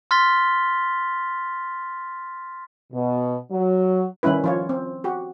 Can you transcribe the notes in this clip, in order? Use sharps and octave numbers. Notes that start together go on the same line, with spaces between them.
C6 F6 A6 B6 G7
B2
F#3
D#3 G3 C#4 E4 B4
F3 F4 C#5
C4
F#4 G4